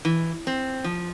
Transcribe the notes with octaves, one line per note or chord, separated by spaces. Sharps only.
E3
C4
F3